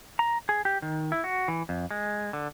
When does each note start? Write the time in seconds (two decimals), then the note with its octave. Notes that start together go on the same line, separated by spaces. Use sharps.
0.19 A#5
0.49 G#4
0.65 G4
0.82 D#3
1.12 E4
1.24 F#4
1.48 E3
1.69 F2
1.91 G#3
2.33 D3